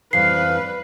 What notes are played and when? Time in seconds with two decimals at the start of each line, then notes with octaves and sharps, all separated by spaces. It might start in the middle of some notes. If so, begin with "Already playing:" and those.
0.13 F2 E3 G3 B4 F5 C7